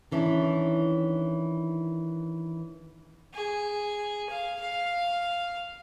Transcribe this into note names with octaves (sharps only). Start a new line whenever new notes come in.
D#3 E3 C#4 D4 E4
G#4
F5
F5